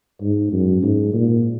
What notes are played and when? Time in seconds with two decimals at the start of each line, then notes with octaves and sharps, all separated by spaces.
0.22 G#2
0.52 F#2
0.82 G#2
1.13 A#2